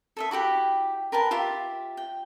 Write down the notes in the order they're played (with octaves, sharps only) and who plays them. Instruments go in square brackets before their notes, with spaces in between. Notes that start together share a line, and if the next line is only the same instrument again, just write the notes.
[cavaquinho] A4 D#5 E5
E4 F#4 G4 G5
A#4 B4 G5 A5
F4 G4 E5
G5